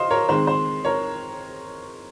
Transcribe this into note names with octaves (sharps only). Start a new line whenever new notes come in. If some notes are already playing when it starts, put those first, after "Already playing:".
Already playing: C5 D#5 F5
A#4 C#5
D#3 G#3 C4 C5
C5
A#4 C#5